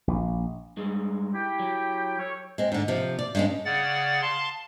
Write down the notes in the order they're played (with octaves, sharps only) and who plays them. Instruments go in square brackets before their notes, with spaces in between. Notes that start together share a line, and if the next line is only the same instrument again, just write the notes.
[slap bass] A#1
[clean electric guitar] G2 G#3
[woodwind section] E4 G4 G5
[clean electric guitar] F#3
[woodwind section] A4 C#5
[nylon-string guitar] G#3 C4
G#2 D3
C3 F3
D5
G2 G#3 C#4
[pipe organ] C#3 D5 F#5 A6
F5 A5 C6